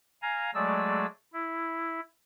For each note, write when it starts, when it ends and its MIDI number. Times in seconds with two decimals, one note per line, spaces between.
0.22 0.51 77
0.22 0.51 80
0.22 0.51 82
0.54 1.06 54
0.54 1.06 56
0.54 1.06 57
0.54 1.06 68
0.54 1.06 74
0.54 1.06 88
1.33 2.00 64